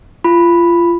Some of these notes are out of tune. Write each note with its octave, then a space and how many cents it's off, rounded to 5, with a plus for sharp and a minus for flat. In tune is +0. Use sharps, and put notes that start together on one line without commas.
F4 -25 B5 +0